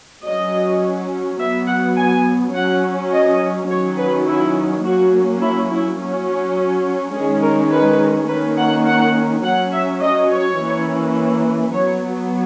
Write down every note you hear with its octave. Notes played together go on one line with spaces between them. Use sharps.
F#3 C#4 D#5
F#3 B3 E5
F#5
G#5
F#3 C#4 F#5
D#5
D#3 F#3 C#4 C#5
B4
E4
F#3 A#3 C#4 F#4
E4
E4
F#3 C#4
D#3 G#3 C#4 G#4
A#4
B4
D#3 A#3 C#4 B4
F#5
F#5
F#3 C#4 F#5
E5
D#5
C#5
E3 A#3 C#4
F#3 B3 C#5